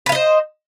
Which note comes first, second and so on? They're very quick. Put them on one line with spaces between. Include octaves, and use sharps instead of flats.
B4 F5 D#5 C5